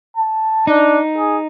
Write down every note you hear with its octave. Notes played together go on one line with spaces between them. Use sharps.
A5
D4 D#4
G#4